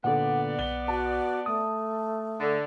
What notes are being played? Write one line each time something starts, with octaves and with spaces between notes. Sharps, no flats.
A#2 D3 B3 D5 F#5
B1 G7
F#4 A5
A3 D#6
D3